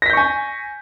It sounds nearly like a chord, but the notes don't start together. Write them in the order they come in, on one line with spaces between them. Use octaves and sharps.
A#6 B6 G6 C#6 G#5